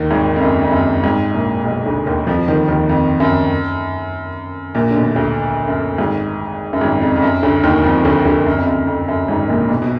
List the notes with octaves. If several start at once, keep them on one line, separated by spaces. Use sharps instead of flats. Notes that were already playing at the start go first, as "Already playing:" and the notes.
Already playing: D#2 D#3
G#1 G#2
F2
F#2
F2
F#2
G#1 G#2
A#1 A#2
B1 B2
D2 D3
D#2 D#3
F2 F3
D#2 D#3
D#2 D#3
F2
F#2
A#1 A#2
D3
B1 B2
D2 D3
F#2
G#1 G#2
F#2
G#1 G#2
F2
F2
F#2
D2 D3
D#2 D#3
F2 F3
D2 D3
D2 D3
F#2
F2
F#2
F2
F#2
G#1 G#2
A#1 A#2
B1 B2
B2